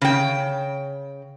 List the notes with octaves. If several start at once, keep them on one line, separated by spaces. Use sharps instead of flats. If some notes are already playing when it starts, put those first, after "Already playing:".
C#3 G5